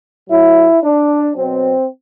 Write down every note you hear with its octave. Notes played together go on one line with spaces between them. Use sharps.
A2 F#3 E4
D4
B2 F#3 C4